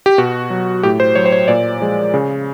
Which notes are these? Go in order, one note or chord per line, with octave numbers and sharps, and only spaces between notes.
G4
B2 F#4
F#3
A2 G4
C5
F#3 C#5
C5
C#5
A#2 D5
F3 G#3
C#3